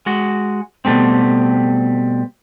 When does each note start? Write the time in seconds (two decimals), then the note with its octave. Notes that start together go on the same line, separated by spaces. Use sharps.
0.06 G#3 F#4
0.85 B2 E3 G3 A3 C4